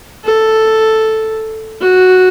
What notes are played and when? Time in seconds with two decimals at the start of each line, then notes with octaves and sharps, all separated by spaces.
0.24 A4
1.81 F#4